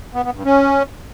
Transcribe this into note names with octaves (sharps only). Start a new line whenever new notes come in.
B3
B3
G2
C#4